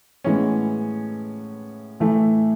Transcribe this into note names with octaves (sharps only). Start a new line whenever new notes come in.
A2 E3 G#3 B3 C#4 C#5
A2 E3 A3